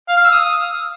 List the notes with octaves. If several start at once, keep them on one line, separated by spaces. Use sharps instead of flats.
F5
F6
E6
D#6